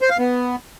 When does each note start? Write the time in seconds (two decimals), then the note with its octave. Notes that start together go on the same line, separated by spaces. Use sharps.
0.01 C5
0.10 F5
0.18 B3